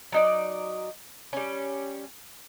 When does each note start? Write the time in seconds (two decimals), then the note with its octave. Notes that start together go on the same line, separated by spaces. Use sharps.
0.12 F#3 D#4 D5
1.33 G3 C#4